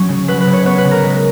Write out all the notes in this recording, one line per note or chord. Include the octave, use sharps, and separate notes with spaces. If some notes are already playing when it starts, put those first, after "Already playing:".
Already playing: F#3 C#4
C#3
F#3 B4
B4
C#3
C#5
B3 C#5
B4
C#3
A#4
G#3